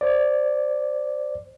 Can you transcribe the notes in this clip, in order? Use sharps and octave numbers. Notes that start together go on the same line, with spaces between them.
C5 D5